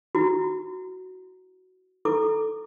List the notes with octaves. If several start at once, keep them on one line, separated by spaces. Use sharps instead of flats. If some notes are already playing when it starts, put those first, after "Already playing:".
E4 F#4
E4 A4 D6